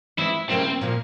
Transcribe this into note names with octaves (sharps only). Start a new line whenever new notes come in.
E3 G#3 C4 E4
C#3 G3 A#3 C4 E4 A#4
A#2 F3 A#3